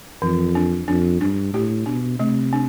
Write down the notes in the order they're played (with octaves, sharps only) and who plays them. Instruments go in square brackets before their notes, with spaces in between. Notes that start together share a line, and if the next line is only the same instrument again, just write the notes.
[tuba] F2 [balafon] E3
[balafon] D4
[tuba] F2 [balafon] D4
[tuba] G2 [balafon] D4
[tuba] A2 [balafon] G4
[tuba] B2 [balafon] D4
[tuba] C3 [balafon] A3
[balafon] D4